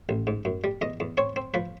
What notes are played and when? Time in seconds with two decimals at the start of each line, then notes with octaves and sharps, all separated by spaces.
0.09 A1
0.27 G#2
0.45 F#2
0.64 G3
0.81 E2 D#5
1.00 E2
1.17 C4 C#5
1.36 C4
1.54 F3 B4